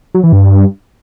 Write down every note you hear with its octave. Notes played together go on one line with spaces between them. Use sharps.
F#3
E3
G2